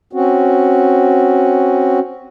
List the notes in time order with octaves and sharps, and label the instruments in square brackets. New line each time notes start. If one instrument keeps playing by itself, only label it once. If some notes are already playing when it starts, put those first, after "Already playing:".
[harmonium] C4 C#4 F#4